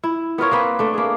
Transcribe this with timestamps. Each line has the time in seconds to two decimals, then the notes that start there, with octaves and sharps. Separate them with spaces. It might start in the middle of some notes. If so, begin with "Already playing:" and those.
0.03 E4
0.38 B3 F4 A#4 C#5
0.51 A#3 C4 B4
0.79 A3 D4
0.94 A#3 G#4